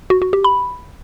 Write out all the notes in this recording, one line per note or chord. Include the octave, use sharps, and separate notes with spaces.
F#4
F#4
G4
B5